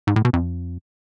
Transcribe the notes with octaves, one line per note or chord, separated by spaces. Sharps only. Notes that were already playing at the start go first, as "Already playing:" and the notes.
G#2
A2
B2
F2